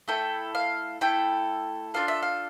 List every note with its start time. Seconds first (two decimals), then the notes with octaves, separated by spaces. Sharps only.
0.08 A3 E4 A4 G5
0.55 F5
1.01 A3 E4 A4 G5
1.94 D4 F4 A4 F5
2.08 E5
2.23 F5